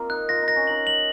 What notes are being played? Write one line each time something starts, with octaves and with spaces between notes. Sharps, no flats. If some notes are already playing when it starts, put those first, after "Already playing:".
Already playing: A#3 C4 F4 A#4 D#5
D#4 F#6
F4 A#6
D#4
A#6
C#4
D#4 F#7
F#7